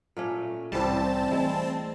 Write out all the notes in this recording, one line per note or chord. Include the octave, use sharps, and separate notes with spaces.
A#2 A3 C#4
C2 A2 E3 G3 C4 G4 A5
E3 G#3 A3 E4